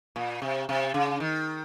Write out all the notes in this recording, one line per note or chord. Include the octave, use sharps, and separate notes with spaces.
A#2
C3
C3
C#3
D#3